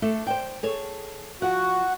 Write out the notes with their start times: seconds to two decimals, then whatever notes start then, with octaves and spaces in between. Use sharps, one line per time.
0.02 A3 D4 A4
0.27 C5 D5 G5
0.63 G#4 A4 C#5
1.42 F3 F#4 F#5